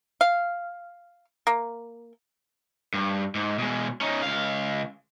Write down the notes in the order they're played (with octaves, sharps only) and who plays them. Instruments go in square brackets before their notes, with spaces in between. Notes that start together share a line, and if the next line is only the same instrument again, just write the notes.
[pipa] F5
A#3
[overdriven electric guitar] G2
G#2
B2 G#3
C#4 D#4
C#2 F5